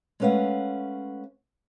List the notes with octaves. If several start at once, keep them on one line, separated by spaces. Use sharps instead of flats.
G#3 A3 C#4 B4 F5 F#5